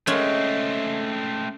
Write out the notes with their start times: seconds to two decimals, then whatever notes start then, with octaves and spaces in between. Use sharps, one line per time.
0.07 G#3 A3 C4 C#4